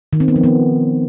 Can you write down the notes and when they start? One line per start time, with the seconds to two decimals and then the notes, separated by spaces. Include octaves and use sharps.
0.13 D#3
0.20 C4
0.28 B3
0.36 F3
0.44 B3